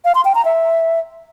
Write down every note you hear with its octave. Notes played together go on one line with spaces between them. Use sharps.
F5
C6
G5
A#5
E5